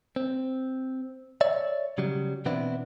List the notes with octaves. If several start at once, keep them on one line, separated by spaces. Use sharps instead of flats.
C4
C#5 D5 E5
C#3 F#3 G3
B2 E3 B3 C4 D4 E4